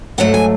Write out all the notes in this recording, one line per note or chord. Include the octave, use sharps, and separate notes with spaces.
G#2 F#3 A3 F#5
G#5